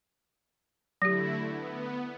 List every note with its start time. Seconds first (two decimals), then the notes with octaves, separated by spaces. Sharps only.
1.02 D3 F#3 A3 E4 G4 A#6
1.43 B3